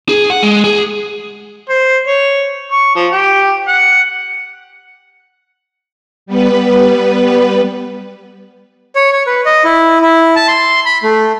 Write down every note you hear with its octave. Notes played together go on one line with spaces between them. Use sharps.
G#4
F#5
G#3
G#4
C5
C#5
C#6
F3
G4
F#5
G3 B3 B4
C#5
C#5
B4
D#5
E4
E4
A5
C6
B5
A3